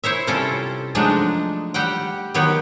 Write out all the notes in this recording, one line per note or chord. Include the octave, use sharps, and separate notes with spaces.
E4 C5 C#5 E5
C3 G3 C#4 E4 F4 A4
F3 F#3 G#3 A3 D4 D#4
G3 G4 F#5 G5
D#3 F#3 B3 G4 C#5